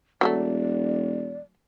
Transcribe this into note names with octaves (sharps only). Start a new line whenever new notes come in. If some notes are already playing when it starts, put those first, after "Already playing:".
E1 F#3 G3 A3 D5